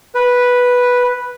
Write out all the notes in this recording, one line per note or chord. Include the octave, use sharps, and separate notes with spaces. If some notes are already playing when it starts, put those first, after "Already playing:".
B4